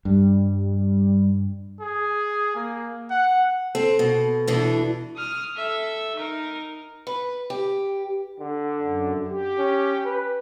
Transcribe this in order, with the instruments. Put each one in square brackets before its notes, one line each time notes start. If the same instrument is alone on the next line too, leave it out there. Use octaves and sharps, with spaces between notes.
[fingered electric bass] G2 [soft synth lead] G3
[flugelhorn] G#4
A#3
F#5
[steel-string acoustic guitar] C4 [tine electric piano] A4
[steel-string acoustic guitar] B2
B2 E3 D4
[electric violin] D#6 F6
A4 E5
D#4 A#4
[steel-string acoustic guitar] B4
G4
[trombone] D3
[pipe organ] F#2
G4
[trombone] C#4
B4